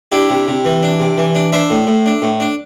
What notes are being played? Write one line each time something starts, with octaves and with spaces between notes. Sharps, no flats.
D4 E4 G4
C3
C3
E3
D4
C3
E3
D4
D4 C5 E5
A2
A2
D4
A2
D4